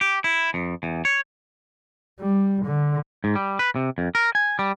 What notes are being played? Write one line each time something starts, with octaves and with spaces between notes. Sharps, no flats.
G4
E4
F2
E2
C#5
G3
D3
G#2
G3
B4
C3
F2
A#4
G#5
G3